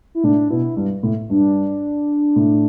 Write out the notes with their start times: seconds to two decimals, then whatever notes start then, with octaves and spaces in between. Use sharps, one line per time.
0.15 E4
0.23 A2 D4
0.50 B2 E4
0.77 G2
1.03 A2
1.30 G2 D4
2.36 A2